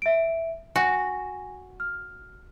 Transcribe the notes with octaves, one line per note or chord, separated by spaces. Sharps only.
E5 D7
F#4 G#5 A#6
F6